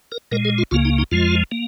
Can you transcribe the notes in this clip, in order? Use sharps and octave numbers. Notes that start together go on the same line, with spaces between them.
A#4
A#2 G#3 A#4
G#4
F4
C#2 C#3 A#3 F4
D#4
D#4
F2 F3 G#3 F4
A#3